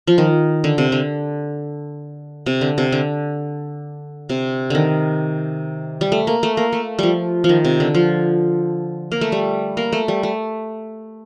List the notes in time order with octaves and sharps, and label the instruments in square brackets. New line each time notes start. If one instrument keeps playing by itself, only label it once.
[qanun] F3
D#3
D3
C3
D3
C3
D3
C3
D3
C3
D3 D#3
G3
A3
A#3
A3
A#3
A3
F3 G3
F3
D#3
C3
D3
F3
A#3
A3
G3
A#3
A3
G3
A3